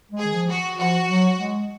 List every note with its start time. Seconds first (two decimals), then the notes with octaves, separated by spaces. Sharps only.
0.12 G#3
0.18 G#4
0.25 D#3
0.34 F3
0.49 F#4
0.79 F3 F#4
1.08 F#3
1.38 G#3